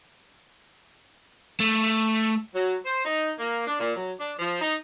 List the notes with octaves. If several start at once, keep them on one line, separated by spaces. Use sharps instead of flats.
A3
F#3
C5
D#4
A#3
D4
A#2
F#3
D4
F3
D#4